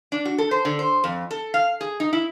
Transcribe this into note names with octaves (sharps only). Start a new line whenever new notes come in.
D4
F#4
A4
C5
D3
C5
F2
A4
F5
G#4
D#4
E4